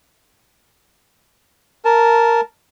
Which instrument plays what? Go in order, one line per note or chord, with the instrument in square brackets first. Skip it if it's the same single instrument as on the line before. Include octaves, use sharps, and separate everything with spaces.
[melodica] A#4 A5